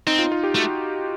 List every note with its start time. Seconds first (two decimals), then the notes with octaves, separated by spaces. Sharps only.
0.07 C4 D#4
0.19 F4
0.32 F4
0.43 G4
0.55 A3 F#4